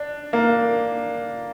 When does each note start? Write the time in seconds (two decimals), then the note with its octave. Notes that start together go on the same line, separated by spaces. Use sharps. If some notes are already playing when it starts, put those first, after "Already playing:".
Already playing: D4
0.33 A#3